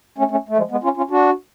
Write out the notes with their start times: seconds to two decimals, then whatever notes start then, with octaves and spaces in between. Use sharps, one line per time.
0.18 A3 C#4
0.31 A3 C#4
0.49 A3
0.57 F3 G#3
0.71 G#3 B3
0.84 C#4 F4
0.97 C#4 F4
1.10 D4 F#4